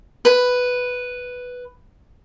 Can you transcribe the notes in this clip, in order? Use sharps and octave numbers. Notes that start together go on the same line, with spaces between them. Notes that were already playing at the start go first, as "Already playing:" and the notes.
B4 B5